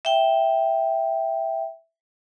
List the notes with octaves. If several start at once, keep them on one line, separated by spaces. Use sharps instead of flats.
E5 G5